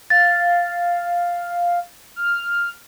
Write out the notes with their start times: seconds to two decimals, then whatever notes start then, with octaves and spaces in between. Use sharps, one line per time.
0.10 F5 A6
2.16 F6